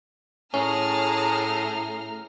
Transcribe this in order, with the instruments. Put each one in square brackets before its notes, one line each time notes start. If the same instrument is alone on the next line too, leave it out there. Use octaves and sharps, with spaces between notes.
[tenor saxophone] A2 [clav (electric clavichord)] C#4 [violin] G#4 A5 [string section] A#5 F6